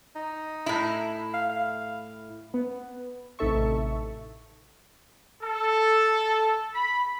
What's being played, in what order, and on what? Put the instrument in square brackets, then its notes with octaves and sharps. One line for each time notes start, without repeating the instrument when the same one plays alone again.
[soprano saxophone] D#4
[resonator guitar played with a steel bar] A2 E4
[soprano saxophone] F5
F5
[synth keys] B3
A1 C3 D#4 A4 E5 C#6
[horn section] A4
B5